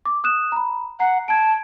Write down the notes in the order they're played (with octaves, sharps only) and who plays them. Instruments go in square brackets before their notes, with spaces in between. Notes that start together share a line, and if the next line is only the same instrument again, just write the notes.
[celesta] D6
D#6 F#6 E7
A#5 B5
[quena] F#5 [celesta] A#5 C7
[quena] A5 [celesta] G#6 D7